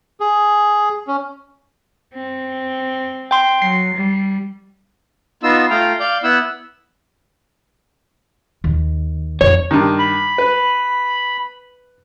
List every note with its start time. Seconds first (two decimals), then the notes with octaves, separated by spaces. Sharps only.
0.20 G#4
1.07 C#4
2.14 C4
3.31 G5 C6
3.62 F#3 C7
3.95 G3
5.43 B3 D#4 F4 E6
5.70 A3 F4 F5 G5 A#5
6.00 D5 F5 G6
6.24 B3 E4 F#5 E6
8.64 D#2
9.41 F2 D#4 C#5
9.71 G2 D#3
9.99 B5
10.38 B4